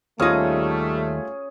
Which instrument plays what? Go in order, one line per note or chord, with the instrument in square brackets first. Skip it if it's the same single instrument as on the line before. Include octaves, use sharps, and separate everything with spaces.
[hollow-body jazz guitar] D#2 D#4 [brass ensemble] G3 A3 [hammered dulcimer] C#4 G#4 [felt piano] F4 D#6